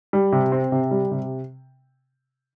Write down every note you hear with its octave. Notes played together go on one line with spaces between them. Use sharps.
G3
C3
C4
C3
G3
C3